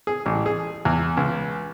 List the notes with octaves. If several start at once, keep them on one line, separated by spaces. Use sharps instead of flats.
G#4
A1
G#4
E2
C#2